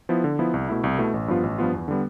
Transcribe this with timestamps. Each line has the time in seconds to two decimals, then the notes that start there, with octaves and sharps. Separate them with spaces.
0.09 F3 B3 E4
0.24 D3
0.39 F3 B3 E4
0.54 C2
0.69 B2 A3 E4
0.84 C2
0.98 B2 A3 E4
1.14 A1
1.28 G2 F3 B3 F4
1.43 A1
1.58 G2 F3 B3 F4
1.74 E2
1.88 D3 G3 B3